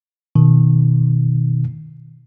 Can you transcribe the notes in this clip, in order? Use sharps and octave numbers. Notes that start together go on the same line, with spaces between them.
B2 D#3